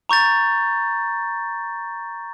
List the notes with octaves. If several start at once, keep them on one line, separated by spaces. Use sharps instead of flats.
A#5 C#6 G6 A6